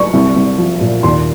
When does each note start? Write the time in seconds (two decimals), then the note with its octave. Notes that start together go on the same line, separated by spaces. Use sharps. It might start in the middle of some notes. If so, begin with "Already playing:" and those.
Already playing: C#6
0.13 C2
0.36 C2
0.58 F3
0.81 A#2
1.03 D#2 C6